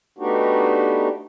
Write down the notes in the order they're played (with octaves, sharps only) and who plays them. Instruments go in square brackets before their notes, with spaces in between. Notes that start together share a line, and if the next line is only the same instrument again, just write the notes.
[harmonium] A3 B3 D4 D#4 F#4 G4